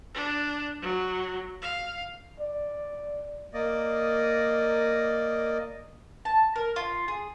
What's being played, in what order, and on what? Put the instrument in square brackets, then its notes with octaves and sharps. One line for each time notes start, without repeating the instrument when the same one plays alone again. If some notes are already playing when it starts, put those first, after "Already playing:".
[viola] D4
F#3
F5
[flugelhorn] D5
[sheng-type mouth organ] A#3 D5 D#5
[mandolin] A5
A#4
F4
G#4